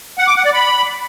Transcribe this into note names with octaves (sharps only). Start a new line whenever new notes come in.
F#5
D6
F#5
D5
B5